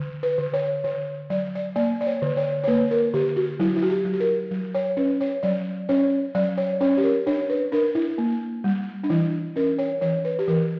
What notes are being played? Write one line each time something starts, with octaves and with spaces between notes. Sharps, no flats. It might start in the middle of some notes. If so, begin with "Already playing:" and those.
Already playing: D3
B4
D3
C#5
D3 C#5
F#3 D5
D5
A#3 D5
D5
C#5
D3
C#5
C#5
A#3 B4
A#4
D3 G4
F#4
F#3 E4
E4
F#4
G4
F#3
G4
A#4
F#3
C#5
C#4 B4
C#5
F#3 D5
C#4 C#5
F#3 D5
C#5
C#4 C#5
G4
A#4
D4 C#5
B4
D4 A#4
E4
A#3
G3
D4
E3 E4
C#4 A#4
C#5
E3 C#5
B4
G4
E3 A#4